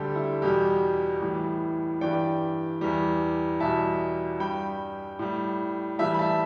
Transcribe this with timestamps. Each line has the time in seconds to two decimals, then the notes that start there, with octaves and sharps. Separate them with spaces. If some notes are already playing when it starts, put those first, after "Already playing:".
Already playing: D2 D3 G3 G4 A4
0.15 E4
0.42 E2 B2 G3 G4
1.21 A2 E3 G3
2.01 G2 E3 G3 D5 G5
2.81 E2 E3 G3
3.60 E2 B2 G3 E5 A5
4.40 G2 G3 G5 B5
5.19 A2 G3
5.99 A2 E3 G3 E5 A5
6.14 B5
6.19 E5 A5